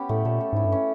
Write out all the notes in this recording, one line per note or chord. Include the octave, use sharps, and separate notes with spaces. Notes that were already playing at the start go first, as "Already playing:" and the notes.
Already playing: B3 C#4 G4
A2 A3
A#2 A4
A4
G#2 E4
G2
C#4